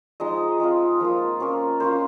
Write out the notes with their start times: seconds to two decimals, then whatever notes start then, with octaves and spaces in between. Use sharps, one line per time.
0.20 F3 G#3 D#4 D#5
0.60 G#3 C4 F4
1.00 F3 A#3 F4
1.40 A#3 C#4 F4
1.80 A#3 C#4 F4 C5